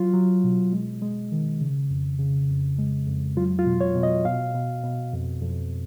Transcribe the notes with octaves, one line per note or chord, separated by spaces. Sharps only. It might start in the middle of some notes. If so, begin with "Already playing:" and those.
Already playing: F#3 F4
F#3
B2
G#3
G#3
D#3
C#3
F2
C#3
F2
G#3
F2
F#3 F4
F4
B2
C#5
B2
D#5
B2 F5
B2
B2
F2
F2